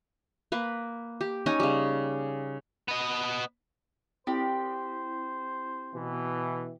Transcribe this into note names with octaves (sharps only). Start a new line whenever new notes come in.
A#3 B4
G4
C#4 D#4 G#5
C#3 G3
B3 D#5
C4 E4 G4 C5
B2 E3